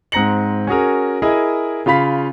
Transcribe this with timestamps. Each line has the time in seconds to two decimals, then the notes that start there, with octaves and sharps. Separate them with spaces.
0.12 G#2 C4 A#5 A#6 C#7 F#7
0.67 C#4 F#4 G#4 A#4
1.22 E4 G#4 A#4 D#5
1.86 C#3 F4 F5 B5 B6